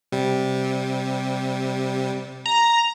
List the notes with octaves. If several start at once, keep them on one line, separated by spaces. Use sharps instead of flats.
C3 G3
A#5